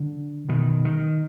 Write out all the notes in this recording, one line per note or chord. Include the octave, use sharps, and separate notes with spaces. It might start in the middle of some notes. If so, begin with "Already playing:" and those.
Already playing: D3
B2 D#3
D#3